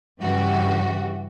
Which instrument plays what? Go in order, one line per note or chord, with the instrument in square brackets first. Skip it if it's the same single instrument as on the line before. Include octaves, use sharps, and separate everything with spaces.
[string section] G2 C#3 E3 F#4 G4